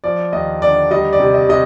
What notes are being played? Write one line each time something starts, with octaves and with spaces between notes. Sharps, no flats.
F3 D5
D#2 D#5
D3 D5
G3 D#5
D5
C3
D#5
C3 D#5